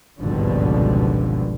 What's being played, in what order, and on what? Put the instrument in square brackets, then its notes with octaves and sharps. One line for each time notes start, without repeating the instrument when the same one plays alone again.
[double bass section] G#1 C#2 G2 B2 D3 F3